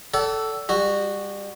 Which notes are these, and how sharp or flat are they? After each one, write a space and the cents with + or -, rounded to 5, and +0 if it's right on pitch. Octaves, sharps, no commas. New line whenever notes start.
A4 +0 D5 -35 F#5 +40
G3 +30 F#4 +0